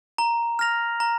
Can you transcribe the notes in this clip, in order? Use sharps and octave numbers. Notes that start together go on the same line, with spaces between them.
A#5
F6 A#6 F7
A#5